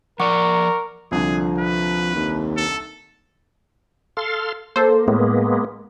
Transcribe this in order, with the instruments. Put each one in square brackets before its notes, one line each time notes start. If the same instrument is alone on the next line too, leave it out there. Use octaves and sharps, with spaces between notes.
[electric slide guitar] F3 D5 [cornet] A#4 [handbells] F#5 C#6 D6
[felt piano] C2 D3 [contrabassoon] F3 [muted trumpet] G#4
[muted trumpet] B4
[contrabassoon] D#2
[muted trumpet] A4
[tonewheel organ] A4 F5 C6
[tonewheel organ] A#3 [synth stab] A4 C5
[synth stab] A2 [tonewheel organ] G#3 A#3 B3